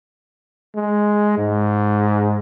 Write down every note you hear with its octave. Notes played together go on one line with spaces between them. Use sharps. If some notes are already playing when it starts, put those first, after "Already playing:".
G#3
G#2